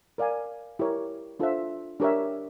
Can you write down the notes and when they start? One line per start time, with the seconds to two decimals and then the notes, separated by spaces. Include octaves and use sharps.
0.18 A#4 D5 F5 G#5
0.79 E4 G4 A#4 C#5
1.40 D4 F4 A4 C5 E5
2.00 D4 G4 A#4 C#5 E5